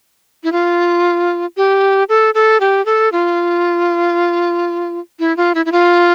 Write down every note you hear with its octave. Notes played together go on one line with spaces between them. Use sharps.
E4
F4
G4
A4
A4
G4
A4
F4
E4
F4
E4
E4
F4